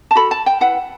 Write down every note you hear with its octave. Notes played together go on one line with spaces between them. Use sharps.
A5
F#4 A4 B5
A5
G5
E4 B4 F#5